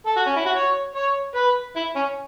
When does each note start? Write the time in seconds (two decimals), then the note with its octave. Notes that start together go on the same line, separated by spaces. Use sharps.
0.06 A4
0.16 F#4
0.27 C#4
0.36 E4
0.46 F#4
0.56 C#5
0.96 C#5
1.36 B4
1.76 E4
1.96 C#4